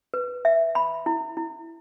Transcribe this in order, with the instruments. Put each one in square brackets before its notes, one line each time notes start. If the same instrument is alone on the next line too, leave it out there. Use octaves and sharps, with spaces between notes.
[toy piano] B4
E5
B5
E4
E4